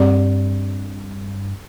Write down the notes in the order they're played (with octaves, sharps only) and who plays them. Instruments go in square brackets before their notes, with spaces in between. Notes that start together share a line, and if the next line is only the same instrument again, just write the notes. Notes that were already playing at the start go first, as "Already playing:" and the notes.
Already playing: [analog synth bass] G2 [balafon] G3 C4 G4 D5